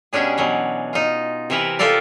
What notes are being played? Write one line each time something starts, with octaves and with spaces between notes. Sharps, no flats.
B2 G3 C#4 D4 G#4
B2 E3 F#3
D#4 F4
C3 E3 E4 A#4 B4
F4 G4 A4 A#4 D5 F5